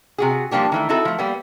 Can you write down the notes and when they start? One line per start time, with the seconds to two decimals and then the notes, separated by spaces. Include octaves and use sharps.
0.18 C3 F#4 G#4
0.51 F3 G3 A#3 D4 G4
0.72 D#3 E3 A3
0.89 C4 D#4 E4 F#4 A4
1.05 F3 A3
1.18 G3 A#3 B3